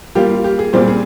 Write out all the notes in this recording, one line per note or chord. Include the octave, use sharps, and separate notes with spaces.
G3 A#3 F4 G4
F4
G4
G#4
A#2 G3 C4 C5
G#4